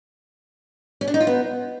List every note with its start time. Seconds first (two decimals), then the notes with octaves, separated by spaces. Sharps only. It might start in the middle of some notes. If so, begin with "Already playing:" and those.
1.01 C#4
1.08 D4
1.14 D#4
1.20 F4
1.27 B3